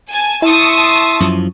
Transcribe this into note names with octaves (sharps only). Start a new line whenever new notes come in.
G#5 A5 G#6
E4 E5 A5 C6 C#6 D#6
F#2 F3